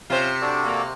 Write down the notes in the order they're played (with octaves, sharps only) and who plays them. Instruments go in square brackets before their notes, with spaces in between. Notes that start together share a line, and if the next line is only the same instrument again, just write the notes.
[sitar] C3 [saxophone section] C#4 F4 C5
[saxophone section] D4 [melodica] F#4 A4 D5
[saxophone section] A#3